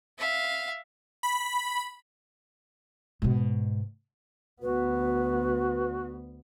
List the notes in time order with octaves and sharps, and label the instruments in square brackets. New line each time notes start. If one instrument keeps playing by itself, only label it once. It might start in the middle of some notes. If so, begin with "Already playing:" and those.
[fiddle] E5 F5
[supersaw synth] B5
[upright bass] G#2 B2
[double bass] D2 B3 [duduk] F#4 [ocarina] B4